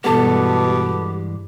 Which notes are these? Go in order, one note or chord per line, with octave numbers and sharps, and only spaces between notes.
G2 B2 E3 G#3 B3 G4 A4